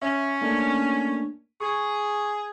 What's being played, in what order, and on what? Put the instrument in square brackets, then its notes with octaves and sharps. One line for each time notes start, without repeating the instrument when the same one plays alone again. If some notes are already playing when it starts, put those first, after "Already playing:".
[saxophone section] C#4 [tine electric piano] E5
[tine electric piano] A3 A#3 D4
[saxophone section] G#4 [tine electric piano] C#6